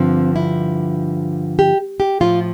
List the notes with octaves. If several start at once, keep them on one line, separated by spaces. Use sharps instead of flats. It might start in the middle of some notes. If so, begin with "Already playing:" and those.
Already playing: G2 D3 F3 C4
E4
G4
G4
A2 F3 F4